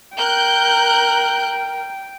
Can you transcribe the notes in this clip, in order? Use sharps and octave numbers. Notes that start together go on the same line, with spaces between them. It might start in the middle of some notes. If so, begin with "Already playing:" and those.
A#4 G5 F#6 G6